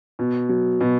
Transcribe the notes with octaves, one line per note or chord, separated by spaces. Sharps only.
B2
F#3
B2